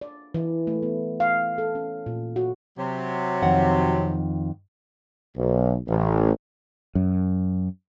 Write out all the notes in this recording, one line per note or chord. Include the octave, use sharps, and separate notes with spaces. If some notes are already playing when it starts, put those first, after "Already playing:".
D5
E3
A3
B3
F5
A4
C#4
A#2
F#4
C3 F#3
F2 D#3 F#5
B1
A1
F#2